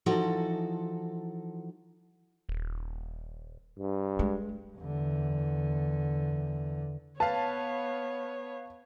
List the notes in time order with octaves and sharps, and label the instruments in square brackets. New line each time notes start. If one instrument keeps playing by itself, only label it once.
[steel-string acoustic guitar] E3 F3 D#4 F#4 A4
[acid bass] D#1
[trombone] G2
[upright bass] G#3
[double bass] E2 D3
[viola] B3 C#5 [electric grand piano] B4 F5 [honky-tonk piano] A5